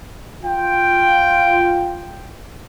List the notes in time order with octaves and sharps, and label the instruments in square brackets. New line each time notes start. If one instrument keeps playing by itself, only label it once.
[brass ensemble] F4 G5